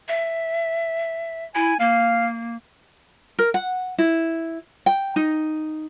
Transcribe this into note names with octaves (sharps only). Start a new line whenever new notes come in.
E5
E4 G#5
A#3 F5
A#4
F#5
E4
G5
D#4